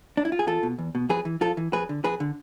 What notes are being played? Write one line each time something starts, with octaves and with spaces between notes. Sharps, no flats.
D4
E4
F4
G#4
E2 F4 A4
B2
E2
B2
F2 G#4 B4
E3
F2 F4 A4
E3
F2 G#4 B4
D3
F2 G#4 B4
D3